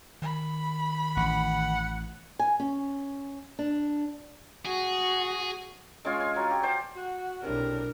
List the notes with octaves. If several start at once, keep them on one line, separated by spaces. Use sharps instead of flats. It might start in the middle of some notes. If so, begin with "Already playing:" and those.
D#3 B5
A1 F#5
G#5
C#4
D4
F#4 G#4
G#3 C#4 F4 G#5
G#5
F#3
G4
C5 D5 G5 A5
F#4
B1 A2 C3 D4 A#4